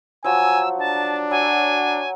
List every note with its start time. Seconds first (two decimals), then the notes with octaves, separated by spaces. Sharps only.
0.24 F3 F#3 G#5 E6
0.79 D4 A5
1.31 F#3 G#5